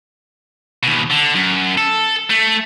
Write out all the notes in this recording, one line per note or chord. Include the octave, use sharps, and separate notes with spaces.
D#2 B2
D3
F#2
A4
A3